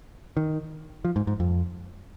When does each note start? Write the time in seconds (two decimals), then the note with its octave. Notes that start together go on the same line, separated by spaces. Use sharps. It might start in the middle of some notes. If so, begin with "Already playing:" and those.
0.37 D#3
1.05 F3
1.16 G#2
1.27 G#2
1.40 F2